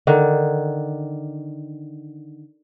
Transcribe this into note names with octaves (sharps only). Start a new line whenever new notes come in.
D3 D#3